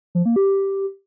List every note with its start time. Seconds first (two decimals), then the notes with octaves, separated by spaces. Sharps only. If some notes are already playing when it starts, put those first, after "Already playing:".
0.15 F3
0.25 A#3
0.36 G4